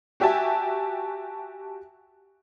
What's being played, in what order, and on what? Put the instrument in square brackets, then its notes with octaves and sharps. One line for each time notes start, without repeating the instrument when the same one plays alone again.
[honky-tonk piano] F#4 G4 E5 G#5 A5